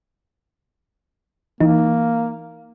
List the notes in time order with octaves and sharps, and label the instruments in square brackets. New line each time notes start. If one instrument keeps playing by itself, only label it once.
[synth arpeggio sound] E3 D#4 [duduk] A#3